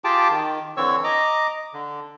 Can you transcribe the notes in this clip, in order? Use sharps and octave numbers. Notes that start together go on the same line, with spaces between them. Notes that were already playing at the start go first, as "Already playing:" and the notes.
F4 G4 G#4 G5 A5 D6
D#3
D3 E3 C4 C#5 C#6 E6
D#5 A#5 D6
D3